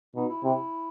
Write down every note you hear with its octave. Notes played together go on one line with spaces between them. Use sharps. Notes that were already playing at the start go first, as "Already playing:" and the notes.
B2 D#4
E4
C3 E4